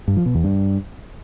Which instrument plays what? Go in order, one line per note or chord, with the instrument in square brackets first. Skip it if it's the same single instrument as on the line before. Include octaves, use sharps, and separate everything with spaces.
[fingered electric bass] G2
F3
B2
E2
G2